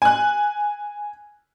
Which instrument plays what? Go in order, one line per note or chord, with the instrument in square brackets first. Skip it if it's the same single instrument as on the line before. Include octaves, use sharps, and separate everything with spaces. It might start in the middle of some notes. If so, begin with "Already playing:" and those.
[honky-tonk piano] G#5 F#6